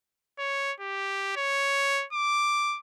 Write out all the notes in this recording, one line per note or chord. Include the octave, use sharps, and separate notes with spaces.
C#5
G4
C#5
D6